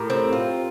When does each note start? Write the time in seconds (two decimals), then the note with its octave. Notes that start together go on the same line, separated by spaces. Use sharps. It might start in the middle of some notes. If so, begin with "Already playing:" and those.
Already playing: A2 G4 A#4
0.10 C4
0.33 F4